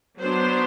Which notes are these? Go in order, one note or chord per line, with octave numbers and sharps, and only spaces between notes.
F#3 B3 D4 C5